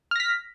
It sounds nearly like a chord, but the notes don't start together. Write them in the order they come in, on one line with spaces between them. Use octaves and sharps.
F6 A#6 B6